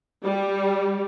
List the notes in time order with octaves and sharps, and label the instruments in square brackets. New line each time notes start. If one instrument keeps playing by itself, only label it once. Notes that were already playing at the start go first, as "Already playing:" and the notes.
[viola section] G3